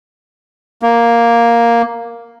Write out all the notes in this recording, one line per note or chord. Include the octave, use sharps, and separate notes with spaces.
A#3